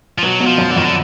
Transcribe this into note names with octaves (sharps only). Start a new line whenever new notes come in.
F3
B2 F#3 B3
B2 B3
F3
F#2 F#3
D3
F2 D#3 F3
D3